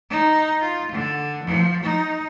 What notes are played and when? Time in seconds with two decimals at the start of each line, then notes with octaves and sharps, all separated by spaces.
0.10 D#4
0.61 F4
0.92 D3
1.43 F3
1.84 D#4